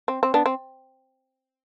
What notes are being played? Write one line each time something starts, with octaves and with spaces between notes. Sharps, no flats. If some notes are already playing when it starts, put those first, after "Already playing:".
C4
C4
B3 D4
C4